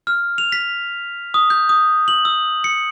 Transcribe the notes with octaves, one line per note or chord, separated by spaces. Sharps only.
F6
F7
B6
D#6
G6
D#6
F#7
E6
C#7